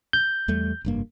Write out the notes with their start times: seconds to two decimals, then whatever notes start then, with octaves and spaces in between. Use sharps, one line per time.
0.13 G6
0.48 E2 G3 A3
0.85 F1 G2 A#3